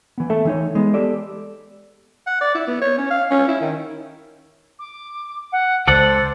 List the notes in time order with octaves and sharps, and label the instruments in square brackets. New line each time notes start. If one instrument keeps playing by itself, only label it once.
[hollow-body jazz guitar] E3 B3
A3 A4 E5
E3 D#4 C#5
G#3 B3
G4 A4 D5
[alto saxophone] F#5
D5
E4
B3
C#5
C#4
F5
C#4
E4
D#3
[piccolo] D6
F#5
[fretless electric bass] C#2 [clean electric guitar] A4 D5 F#5 [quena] C5 [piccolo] A6